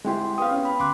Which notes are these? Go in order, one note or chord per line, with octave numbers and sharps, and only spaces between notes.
G#3 C4 E4 G4 G5 C6
B3 B4 F5 G5 D#6
C#4
B5
D2 C6 D6 F#6